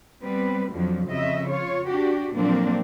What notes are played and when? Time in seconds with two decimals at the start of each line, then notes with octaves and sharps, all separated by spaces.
0.22 G3 B3 C4 B4
0.71 F2 D3 F3 F#3
1.08 F2 C#3 D#5 E5
1.48 F4 C#5
1.87 D4 F#4 G4
2.34 F2 A#2 F#3 A#3 C4 D4